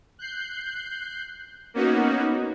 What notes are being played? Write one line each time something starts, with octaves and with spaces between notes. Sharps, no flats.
F#6 G6 C7
A#3 B3 C#4 D#4 F#4